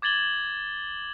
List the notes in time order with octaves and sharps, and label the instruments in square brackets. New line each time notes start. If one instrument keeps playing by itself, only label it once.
[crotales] D6 G#6 A6 F#7 G7